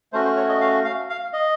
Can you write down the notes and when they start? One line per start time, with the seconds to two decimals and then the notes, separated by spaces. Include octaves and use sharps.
0.13 A3 C#4 F#4 C5
0.24 C5
0.37 C#5
0.48 D#5
0.61 F5
0.85 F5
1.10 F5
1.33 D#5